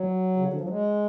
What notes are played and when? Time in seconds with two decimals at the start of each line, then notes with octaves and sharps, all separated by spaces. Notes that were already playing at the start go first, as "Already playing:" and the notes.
Already playing: F#3
0.36 C#3
0.45 D3
0.53 F3
0.61 F#3
0.69 G#3